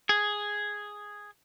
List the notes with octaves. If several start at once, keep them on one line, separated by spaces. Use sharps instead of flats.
G#4